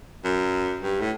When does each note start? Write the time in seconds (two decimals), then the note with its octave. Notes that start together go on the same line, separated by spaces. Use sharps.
0.24 F#2
0.82 G2
1.01 A2